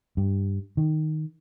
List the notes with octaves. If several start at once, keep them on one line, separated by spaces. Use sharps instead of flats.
G2
D#3